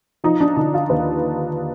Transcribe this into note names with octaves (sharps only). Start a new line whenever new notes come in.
F3 D#4
D4
D3 D#4
F4
D#2 B4